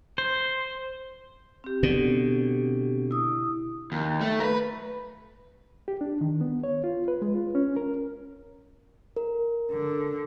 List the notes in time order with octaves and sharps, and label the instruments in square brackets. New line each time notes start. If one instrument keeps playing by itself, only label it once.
[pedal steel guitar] C5
[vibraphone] C4 G4
[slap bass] B2 D3
[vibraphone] E4 D#6
[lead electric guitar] D#2
A3
A#4 B4
[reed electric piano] G4
D4
D#3
B3
C#5
F4
B4
G#3
F4
C#4
A#4
[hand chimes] A#4
[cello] D3